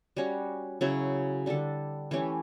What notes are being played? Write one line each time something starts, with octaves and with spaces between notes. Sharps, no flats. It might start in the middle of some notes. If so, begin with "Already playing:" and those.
G3 C#4 F#4
C#3 F#3 C#4 E4
D3 G3 D4 A4
E3 A3 C#4 G4